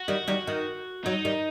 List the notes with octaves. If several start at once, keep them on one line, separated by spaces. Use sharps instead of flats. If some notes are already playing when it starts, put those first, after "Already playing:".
Already playing: F#4
D#3 G3
D#3 G3
D#3
F#3 D#4
D#3 G3